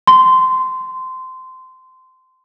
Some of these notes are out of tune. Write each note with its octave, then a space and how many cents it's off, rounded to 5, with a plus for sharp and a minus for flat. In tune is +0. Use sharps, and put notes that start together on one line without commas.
C6 -20